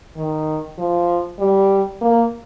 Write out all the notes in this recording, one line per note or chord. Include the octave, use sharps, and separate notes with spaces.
D#3
F3
G3
A#3